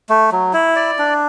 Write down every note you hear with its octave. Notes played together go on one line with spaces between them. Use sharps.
A3
F#3
E4
D5
D4